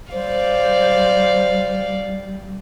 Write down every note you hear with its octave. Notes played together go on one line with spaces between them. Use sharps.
G3 C5 D5 F5